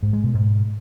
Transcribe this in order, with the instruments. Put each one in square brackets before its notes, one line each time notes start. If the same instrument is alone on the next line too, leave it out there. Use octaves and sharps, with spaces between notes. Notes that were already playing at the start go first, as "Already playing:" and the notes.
[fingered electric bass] G#2
G#3
B2
G#2